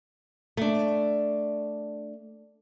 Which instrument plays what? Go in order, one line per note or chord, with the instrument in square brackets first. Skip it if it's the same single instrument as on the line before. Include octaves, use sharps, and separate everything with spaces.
[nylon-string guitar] A3 D4